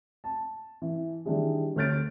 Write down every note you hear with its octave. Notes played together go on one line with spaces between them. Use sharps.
A5
E3
D#3 E3 G3 D4 E4 G#4
D2 C#5 F6 G6 A6 D7